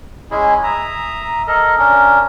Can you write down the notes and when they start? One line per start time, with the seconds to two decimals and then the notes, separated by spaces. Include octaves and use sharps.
0.31 G#3 C#4 E4 G#4
0.63 E5 A#5 D#6
1.47 A4 A#4 D#5
1.78 C#4 D4 A#4